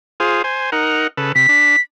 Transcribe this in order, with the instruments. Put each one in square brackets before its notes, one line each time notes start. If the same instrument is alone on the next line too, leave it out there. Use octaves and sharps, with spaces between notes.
[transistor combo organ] F4 G#4 C5
C5 G#5
D#4 A#4 F#5
C#3 A4 B4
[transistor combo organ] C3 [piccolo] B6
[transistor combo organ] D4